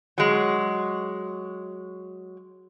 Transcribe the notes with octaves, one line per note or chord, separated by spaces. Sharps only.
F#3 G#3